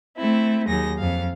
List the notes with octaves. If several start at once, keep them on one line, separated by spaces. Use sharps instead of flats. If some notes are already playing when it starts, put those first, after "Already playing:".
A3 C4 E4
D#2 F#3 D#4 G#4 A#6
F2 F5